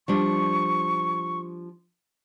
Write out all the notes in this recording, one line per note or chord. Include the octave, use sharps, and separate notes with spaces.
F3 G3 D4 C#6